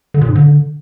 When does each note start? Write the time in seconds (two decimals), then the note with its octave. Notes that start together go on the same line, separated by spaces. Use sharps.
0.14 D3
0.21 A#2
0.28 G#2
0.35 D3